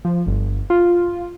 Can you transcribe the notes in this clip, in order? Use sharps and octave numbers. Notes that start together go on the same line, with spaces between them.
F3
G1
F4